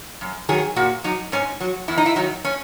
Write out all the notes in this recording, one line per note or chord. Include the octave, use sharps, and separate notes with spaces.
F#2
D#3 F#3 G#4
A#2 F#4
F#3 D#4
G#2 C#4
F#3
E2 E4
D#4
E4
D#3 F#3 D#4
C#4